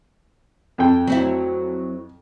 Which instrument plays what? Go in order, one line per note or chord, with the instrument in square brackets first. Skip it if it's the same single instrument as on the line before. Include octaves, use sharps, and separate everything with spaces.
[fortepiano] F2 A4 G5
[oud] F#3 C4 E4